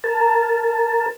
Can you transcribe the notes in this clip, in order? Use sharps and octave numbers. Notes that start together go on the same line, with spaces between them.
A#4 A5